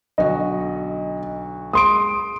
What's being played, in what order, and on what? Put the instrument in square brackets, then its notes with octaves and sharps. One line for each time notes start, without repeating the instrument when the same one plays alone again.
[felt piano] B1 D3 F#4 [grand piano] D#5
[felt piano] G#3 D7 [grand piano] C6 D#6